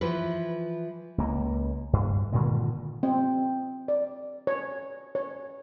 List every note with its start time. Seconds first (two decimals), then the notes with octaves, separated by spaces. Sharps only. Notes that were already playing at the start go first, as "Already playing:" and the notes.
0.01 E3 F3 E4 B4
1.18 C#2 A#3
1.93 G2
2.32 A#2 D3 D#3 G#3
3.03 C4
3.88 D5
4.47 C#5
5.15 C#5